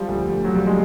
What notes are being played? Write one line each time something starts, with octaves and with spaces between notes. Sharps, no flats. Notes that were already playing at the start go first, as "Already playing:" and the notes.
Already playing: F3 G3
D2
D2
F#3
F3 G3
G#3